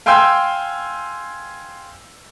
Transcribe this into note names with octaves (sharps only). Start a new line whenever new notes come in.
F5 G5 G#5 C6 E6 G6